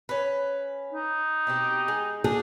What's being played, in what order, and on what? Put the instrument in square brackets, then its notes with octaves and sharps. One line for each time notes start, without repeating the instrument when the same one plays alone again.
[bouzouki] C#4 B4
[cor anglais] D#4
[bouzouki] B2 C4 G4
G#3
[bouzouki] D3 D4 [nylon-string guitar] G#4